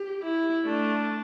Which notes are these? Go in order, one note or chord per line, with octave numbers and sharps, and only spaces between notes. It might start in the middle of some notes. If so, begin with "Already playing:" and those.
Already playing: G4
E4
A3 D4